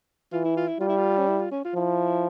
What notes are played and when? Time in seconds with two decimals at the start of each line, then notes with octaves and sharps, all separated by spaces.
0.32 E3 F4
0.45 E4
0.57 F4
0.68 E4
0.80 G3 F4
0.89 E4
0.97 F4
1.18 C#4
1.28 E4
1.39 F4
1.52 C#4
1.65 F4
1.75 F3 E4